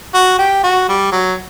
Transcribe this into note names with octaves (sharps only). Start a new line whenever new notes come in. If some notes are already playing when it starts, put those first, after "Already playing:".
F#4
G4
F#4
G3
F#3